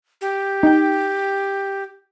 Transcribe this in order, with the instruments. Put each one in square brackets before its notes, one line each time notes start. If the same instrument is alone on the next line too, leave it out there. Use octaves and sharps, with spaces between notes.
[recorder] G4
[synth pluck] D#4 G5